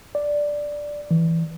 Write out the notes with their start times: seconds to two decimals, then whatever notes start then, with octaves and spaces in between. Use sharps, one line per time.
0.15 D5
1.11 E3